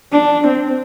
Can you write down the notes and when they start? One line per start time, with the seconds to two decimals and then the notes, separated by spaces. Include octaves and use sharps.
0.12 D4
0.47 C4